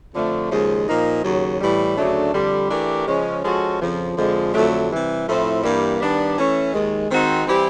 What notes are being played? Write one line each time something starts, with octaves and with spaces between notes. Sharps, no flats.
F2 D3 F3 A3
D#2 C#3 F3 G#3
A#2 F3 A#3 D#4
D#2 C#3 F#3
A2 E3 G3
D2 C#3 F#3 A3 D4
F2 D3 G3
E3 A3 D4 G4 A#4
C#3 F3 G#3 C#4
F3 G#3 C#4 F#4 A4
F2 C#3 F3
F2 D3 F3 G#3
F2 D3 F#3 A3
C3 E3 G3
A2 F3 A3 C4 E4
G2 E3 G3 A#3
D#3 G3 B3 D4
E3 A3 C#4
D#2 D#3 G#3
D#3 G#3 C4 D#4 F#4
E3 G3 C4 E4 G4